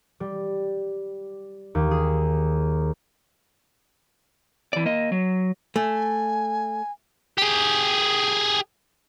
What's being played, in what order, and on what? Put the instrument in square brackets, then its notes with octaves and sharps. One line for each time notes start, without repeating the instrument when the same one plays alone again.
[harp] G3
D#2
G#4
[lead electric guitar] E3 D5
A#3 D#5
F#3
[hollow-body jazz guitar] A3 [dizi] G#5
[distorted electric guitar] G4 G#4